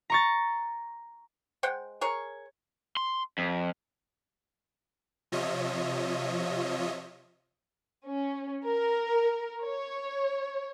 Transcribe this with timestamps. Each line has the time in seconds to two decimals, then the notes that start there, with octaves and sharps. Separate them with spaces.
0.10 A#5 C#6 A6
1.63 G#3 C5 F#5 G5
2.01 G#4 A#4 C#5
2.97 C6
3.38 F2
5.32 C3 F3 F4 C#5 D#5 E5
8.05 C#4
8.66 A#4
9.66 C#5